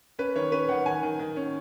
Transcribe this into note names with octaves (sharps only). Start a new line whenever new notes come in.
C#4 B4
D#3 C#5
C#4 B4
D#3 F#5
D#3 G#5
D#3
D#3
C#4